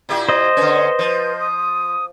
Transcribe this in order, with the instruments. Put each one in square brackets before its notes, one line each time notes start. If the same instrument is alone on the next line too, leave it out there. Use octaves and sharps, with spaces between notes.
[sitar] A#2 E4 G4
[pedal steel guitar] C5 D#5
[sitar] D3 C#4 [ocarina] B4
[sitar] F3
[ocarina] D#6